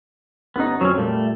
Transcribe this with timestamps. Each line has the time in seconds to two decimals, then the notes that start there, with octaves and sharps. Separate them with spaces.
0.56 G1 B3 C#4 D#4
0.81 F2 F#3 C4 C#4
0.98 A#2 G3 A3